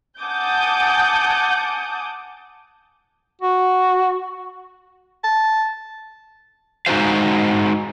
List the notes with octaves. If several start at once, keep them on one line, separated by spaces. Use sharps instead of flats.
F#5 G#5 A5 D6 D#6 G6
F#4
A5
G#3 D#4 F#4 C5 F5